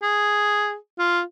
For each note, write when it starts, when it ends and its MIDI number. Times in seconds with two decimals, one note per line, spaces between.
0.03 0.75 68
0.99 1.22 65